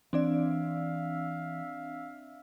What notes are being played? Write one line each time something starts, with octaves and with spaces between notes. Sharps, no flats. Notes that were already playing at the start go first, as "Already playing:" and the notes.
E3 C4 D4 D5 E5 F5